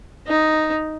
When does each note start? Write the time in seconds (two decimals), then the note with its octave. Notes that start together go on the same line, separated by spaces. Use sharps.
0.27 D#4